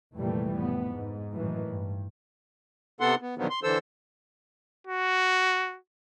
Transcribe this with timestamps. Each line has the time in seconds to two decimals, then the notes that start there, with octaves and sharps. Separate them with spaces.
0.15 F1 A#2 E3 G3 A3
0.53 F1 A2 B3
0.90 G#2
1.34 F#2 A2 D#3 E3
1.69 G2
3.01 C3 B3 A4 F#5 C6
3.22 B3
3.38 A#2 D3 D#3 F3 F#3 B3
3.50 C6
3.63 D3 E3 A4 C5 E6
4.87 F#4